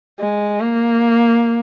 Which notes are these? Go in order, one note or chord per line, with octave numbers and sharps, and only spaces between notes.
G#3
A#3